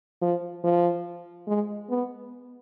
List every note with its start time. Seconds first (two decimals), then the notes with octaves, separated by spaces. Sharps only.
0.22 F3
0.64 F3
1.48 G#3
1.90 B3